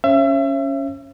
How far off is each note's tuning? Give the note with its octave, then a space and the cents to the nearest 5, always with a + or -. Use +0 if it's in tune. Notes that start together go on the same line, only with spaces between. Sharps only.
C#4 +0 C#5 -45 E5 +35